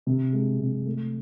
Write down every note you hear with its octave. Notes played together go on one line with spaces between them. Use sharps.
C3
G#3
C3
A3